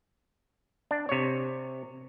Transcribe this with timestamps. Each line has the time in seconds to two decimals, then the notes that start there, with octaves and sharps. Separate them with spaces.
0.91 D4
1.09 C3 C#5